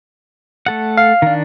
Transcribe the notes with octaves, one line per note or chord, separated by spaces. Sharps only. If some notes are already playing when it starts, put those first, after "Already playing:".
A3 A4 F#5
F5
D#3 D4